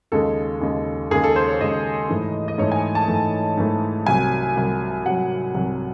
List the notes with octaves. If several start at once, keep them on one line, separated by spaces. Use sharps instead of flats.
D#2 C#3 G#3 A4
D#2 C#3 G#3
D#2 C#3 G#3 G#4
A4
C5
C#5
D#2 C#3 G#3 D#5
G#2 E3 A3
D#5
G#2 E3 A3 C#5
G#5
A5
G#2 E3 A3
G#2 E3 A3
C2 C3 F#3 G#5
C2 C3 F#3
C2 C3 F#3 F#5
C2 C3 F#3